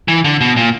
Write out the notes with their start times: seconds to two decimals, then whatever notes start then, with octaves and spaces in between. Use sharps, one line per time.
0.08 E3
0.24 D3
0.41 B2
0.57 A#2